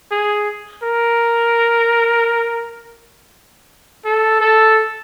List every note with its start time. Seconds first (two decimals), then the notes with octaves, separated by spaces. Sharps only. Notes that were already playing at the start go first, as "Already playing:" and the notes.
0.11 G#4
0.83 A#4
4.05 A4
4.41 A4